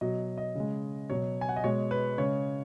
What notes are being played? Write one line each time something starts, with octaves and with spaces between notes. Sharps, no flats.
B2 F#3 D#5
D#5
C#3 G#3
B2 F#3 C#5
G#5
F#5
D#5
B2 G#3 C#5
B4
C#3 G#3 C#5